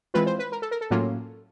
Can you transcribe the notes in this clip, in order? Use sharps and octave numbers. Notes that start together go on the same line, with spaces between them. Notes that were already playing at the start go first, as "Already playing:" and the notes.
E3 G#3 C4 F4 B4
C5
B4
A#4
A4
A#4
A4
A2 F#3 A#3 C#4 F4